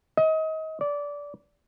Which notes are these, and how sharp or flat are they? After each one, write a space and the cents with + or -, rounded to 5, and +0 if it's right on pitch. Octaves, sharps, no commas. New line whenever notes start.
D#5 +30
D5 -20